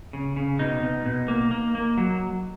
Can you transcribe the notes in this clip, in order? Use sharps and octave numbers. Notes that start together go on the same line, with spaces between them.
C#3
C#3
B2 D#4
B2
B2
A#3
A#3
A#3
F#3